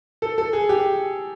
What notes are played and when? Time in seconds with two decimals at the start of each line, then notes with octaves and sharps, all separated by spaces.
0.22 A4
0.38 A4
0.53 G#4
0.69 G4